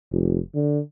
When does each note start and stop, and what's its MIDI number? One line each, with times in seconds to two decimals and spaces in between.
0.11 0.39 29
0.55 0.80 50